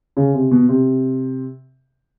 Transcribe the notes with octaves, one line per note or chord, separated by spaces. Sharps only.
C#3
C3
B2
C3